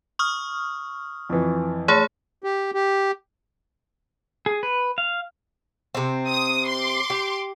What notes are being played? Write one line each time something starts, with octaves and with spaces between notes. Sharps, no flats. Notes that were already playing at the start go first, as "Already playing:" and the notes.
C#6 D#6 F6
F2 E3
A3 G#4 C#5 A5
G4
G4
G#4
B4
F5
C3 C4
D#6
C6 D6
G4